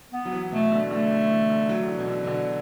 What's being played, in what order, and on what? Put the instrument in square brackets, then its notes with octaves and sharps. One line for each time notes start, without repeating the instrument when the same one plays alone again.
[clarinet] B3
[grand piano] F#3
E3
[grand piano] B2 [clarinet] A3
[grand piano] D3
[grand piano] D3 [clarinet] A3
[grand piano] D3
E3
D3
F#3
D3
E3
B2
D3
B2
D3